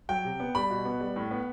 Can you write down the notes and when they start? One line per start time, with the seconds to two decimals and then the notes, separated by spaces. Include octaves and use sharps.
0.09 F#3 G5
0.25 C3
0.40 B3
0.55 G3 B5
0.70 B2
0.85 B3
1.00 G3
1.16 A2
1.31 B3